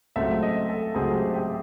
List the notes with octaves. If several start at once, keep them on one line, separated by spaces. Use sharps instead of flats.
C#2 C#3 F#3 A3 C4 E5
D#5
A4
C#2 C#3 F#3 A3 C4 G#4
G4
G4